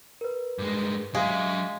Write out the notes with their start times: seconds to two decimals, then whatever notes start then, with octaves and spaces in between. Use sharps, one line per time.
0.21 A#4 B4
0.59 G2 G#3
1.15 F#3 G#3 E5 F5